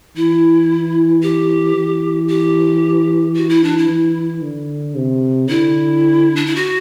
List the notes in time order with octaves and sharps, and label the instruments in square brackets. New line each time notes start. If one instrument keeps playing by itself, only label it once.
[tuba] E3 [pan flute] E4
[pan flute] G4
[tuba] E3
[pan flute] G4
F#4
E4
D4
E4
[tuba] E3
D3
C3
[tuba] D3 [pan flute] E4
[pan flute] D4
E4
F#4